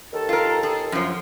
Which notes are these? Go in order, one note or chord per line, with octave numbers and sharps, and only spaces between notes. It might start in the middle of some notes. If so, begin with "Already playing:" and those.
D#2 D#3 A4
F4 A#4
G#4
F#2 F3